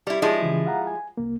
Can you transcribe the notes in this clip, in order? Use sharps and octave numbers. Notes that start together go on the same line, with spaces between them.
G3 E4 D5
F3 G#3 D#4 E4
C#3 E3
F5 F#5 A#5
G#5
C2 A#3